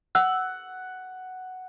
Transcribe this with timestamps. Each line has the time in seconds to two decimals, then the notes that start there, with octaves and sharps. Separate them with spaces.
0.15 F#5 E6